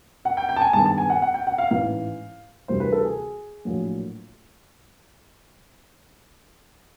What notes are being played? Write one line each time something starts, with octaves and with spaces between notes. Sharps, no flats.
F#5
G5
G5
A5
G#5
G2 D#3 G#3 B3 A5
A5
G#5
F#5
F#5
G5
F#5
F5
A1 G#2 E3 F5
D2 C3 E3 G3 C5
B4
A4
G#4
A#1 A2 F#3 A#3